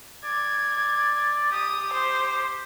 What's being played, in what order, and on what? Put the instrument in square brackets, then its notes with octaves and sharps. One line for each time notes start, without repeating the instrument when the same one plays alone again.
[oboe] D5 [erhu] G#6
[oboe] G4 [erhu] D#6
[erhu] C5